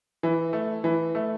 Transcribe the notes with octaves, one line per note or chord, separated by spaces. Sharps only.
E3
A3
E3
A3